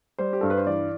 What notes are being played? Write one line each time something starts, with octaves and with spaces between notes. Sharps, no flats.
G3 C5
G4
G2 A4
B4
C5
E3 D5